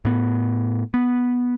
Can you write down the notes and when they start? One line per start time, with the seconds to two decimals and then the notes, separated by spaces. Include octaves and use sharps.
0.05 A2 B3
0.94 B3